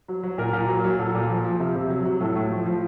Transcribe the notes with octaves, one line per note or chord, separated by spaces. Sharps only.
F#3
F#3
A#2 A#4
A#2
F#3 A#4
F#3
A#2 A4
A#2
F3
F3
C3
C3
F#3
F#3
A2 A4
A2
F3
F3